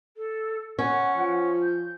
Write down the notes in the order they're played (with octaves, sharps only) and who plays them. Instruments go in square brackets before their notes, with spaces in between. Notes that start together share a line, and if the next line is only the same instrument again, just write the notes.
[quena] A4
[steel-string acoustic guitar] C#4 [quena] F#5
[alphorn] F3
[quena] G6